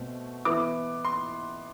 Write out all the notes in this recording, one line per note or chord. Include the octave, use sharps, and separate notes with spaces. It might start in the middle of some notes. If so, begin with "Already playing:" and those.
Already playing: B2 A3 C4
E3 B3 E4 D6
C6